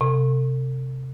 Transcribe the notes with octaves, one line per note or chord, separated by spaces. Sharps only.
C3